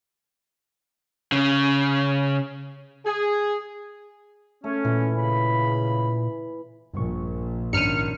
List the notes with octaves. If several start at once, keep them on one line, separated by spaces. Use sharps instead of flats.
C#3
G#4
A3 C#4
A#2 E3 G#5
C#3 B5
A#1 G2 C#6
G#1 C#4 D4 F6 C#7 D#7